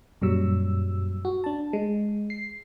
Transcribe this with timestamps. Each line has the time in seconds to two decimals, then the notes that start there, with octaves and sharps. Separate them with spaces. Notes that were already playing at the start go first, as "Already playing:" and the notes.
0.21 F#2 A#2 F#3 G3 E6
1.25 F#4
1.44 D4 A5
1.73 G#3
2.30 C7